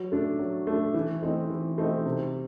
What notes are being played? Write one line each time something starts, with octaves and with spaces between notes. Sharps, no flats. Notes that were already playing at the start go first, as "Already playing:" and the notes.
Already playing: F#3
A3 D4
F#3
A3 D4
E3
A3 C4 D#4
E3
A3 C4 D#4
C3